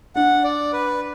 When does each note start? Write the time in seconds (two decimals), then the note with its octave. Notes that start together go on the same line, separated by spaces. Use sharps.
0.15 D4 F#5
0.44 D5
0.73 B4